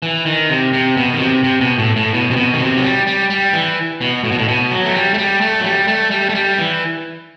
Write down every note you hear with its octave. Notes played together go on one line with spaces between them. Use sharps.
E3
D#3
C3
C3
B2
D#3
C3
C3
B2
A2
A2
B2
C3
B2
D#3
C3
F#3
G3
G3
G3
E3
B2
A2
B2
A2
B2
F#3
A3
G3
A3
G3
A3
F#3
G3
A3
G3
A3
G3
E3